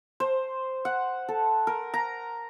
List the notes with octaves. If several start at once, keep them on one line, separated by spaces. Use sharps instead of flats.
C5
F#5
A4
A#4
A#5